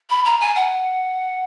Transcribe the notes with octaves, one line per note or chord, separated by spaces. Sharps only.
B5
A#5
G#5
F#5